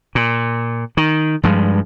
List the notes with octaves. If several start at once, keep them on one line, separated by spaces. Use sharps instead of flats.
A#2
D#3
G2 F3 G#3